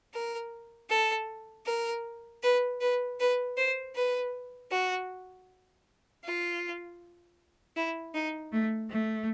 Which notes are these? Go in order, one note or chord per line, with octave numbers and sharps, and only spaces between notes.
A#4
A4
A#4
B4
B4
B4
C5
B4
F#4
F4
E4
D#4
A3
A3